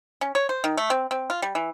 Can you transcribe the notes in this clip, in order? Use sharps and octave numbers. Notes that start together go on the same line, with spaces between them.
C#4
C#5
C5
D#3
A3
C4
C4
F4
G3
E3